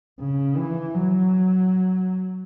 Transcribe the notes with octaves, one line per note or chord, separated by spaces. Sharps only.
C#3
E3
F#3